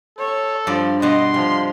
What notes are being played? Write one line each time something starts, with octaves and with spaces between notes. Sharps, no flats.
A4 C#5
G2 F3 D5
G2 B2 D#5 C6
C3 F3